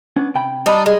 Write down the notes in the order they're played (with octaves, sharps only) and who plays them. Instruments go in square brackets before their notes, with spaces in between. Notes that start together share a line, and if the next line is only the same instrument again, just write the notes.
[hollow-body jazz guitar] B3 C#4 D4
C3 G5 B5
[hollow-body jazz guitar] G3 A5 B5 [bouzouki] D4 D#4
[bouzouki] G#3